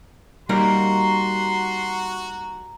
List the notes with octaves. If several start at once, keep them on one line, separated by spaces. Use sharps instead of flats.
G3 A#3 D#4 F#4 A#5 C6